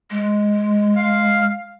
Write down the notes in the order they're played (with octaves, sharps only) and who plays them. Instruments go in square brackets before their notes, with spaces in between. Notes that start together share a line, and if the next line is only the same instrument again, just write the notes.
[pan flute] G#3
[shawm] F5